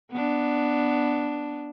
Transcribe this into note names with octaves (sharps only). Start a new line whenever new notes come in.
B3 D4